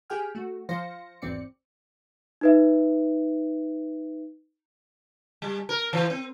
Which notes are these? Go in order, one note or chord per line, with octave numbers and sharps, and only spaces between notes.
G4 G#4 G5 G#5 F6
A3 F#4
F3 C5 F5 A#6 C#7
G#1 E2 C4 D5 C#7
D#4 B4 E5
G3
A#4
E3
C4